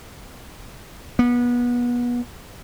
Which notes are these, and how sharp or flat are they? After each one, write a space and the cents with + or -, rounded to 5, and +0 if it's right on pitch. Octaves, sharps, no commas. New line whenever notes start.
B3 -30